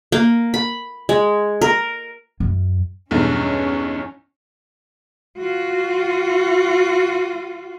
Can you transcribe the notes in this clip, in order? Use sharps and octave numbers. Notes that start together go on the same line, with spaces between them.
A#3
B5
G#3
A#4
F#2
B1 E2 G2 C#4
F4 F#4